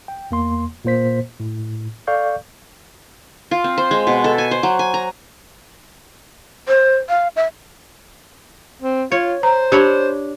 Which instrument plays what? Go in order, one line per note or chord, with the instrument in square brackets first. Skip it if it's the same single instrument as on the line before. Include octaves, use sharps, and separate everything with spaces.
[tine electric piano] G5
E2 A#3 C6
A#2 A#3 C5 B6
A2
A4 D5 F5 C#6 G6
[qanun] F4
C4
C5
G#3
B2
A4
G#5
C5
F#3
G#5
A#5
[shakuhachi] C5
F5
E5
[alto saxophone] C4
[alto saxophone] F4 [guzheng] C#5
[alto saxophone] C5 [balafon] A#5
[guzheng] D4 C#5 B5 [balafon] G4